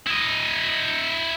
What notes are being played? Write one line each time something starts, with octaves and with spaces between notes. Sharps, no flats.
E4 D#5